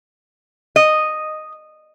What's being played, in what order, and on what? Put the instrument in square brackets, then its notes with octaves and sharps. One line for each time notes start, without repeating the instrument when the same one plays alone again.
[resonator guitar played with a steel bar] D#5